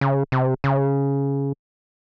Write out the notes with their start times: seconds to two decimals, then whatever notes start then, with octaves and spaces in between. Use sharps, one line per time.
0.01 C#3
0.32 C3
0.64 C#3